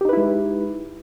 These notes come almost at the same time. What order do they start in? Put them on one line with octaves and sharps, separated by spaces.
G4 D#4 B4 E4 G#3